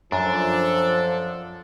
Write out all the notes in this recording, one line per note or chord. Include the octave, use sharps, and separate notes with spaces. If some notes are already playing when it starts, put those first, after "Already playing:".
F#2 F3 D4 A4 D5